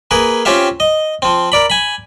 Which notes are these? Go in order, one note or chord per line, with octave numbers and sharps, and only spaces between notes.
A#3 G#4 A#4 B4
C4 C#4 F4 G4 E5 F5
D#5
F3 C4
A#4 D5 B5
G#5 B5